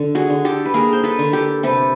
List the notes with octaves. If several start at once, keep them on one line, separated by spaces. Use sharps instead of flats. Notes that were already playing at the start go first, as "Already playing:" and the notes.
Already playing: D3
F#4 G#4
D3
G4 A4
B4
A#3 G#4 A#4
C5
A4 B4
D3
G4 A4
C3 A4 B4